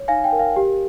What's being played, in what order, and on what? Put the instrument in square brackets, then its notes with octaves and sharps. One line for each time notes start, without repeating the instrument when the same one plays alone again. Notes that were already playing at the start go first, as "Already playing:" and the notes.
Already playing: [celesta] C#5
D#4 F5 G#5
G5
A#4
F5
G4